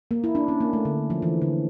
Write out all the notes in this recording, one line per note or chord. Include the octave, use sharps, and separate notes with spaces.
A#3
E4
D4
C#4
A#3
A3
D3
F3
E3
D3